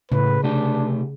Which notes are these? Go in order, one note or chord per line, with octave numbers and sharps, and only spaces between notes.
A2 C#3 B4
C3 A3 D4 G4